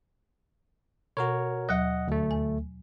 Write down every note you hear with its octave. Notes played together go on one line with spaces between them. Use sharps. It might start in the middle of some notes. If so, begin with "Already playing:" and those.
B2 F#4 A#4 C#5
D#2 F#3 D#5 F#5
D2 A3
G#5